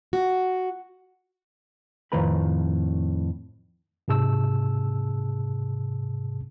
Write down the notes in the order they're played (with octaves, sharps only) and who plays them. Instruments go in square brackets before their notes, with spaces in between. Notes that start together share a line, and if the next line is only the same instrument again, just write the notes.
[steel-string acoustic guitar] F#4
[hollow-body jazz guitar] F2 A2 D#3 B4 A#5 B5
[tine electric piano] G#2 C3 G#4 A5 E6